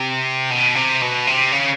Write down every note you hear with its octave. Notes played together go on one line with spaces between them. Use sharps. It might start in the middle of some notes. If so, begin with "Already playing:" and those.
Already playing: C3
B2
C3
B2
C3
C#3